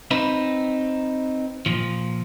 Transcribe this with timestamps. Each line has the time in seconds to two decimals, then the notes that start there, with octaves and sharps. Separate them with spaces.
0.11 C4 D#4 B4
1.66 A#2 F3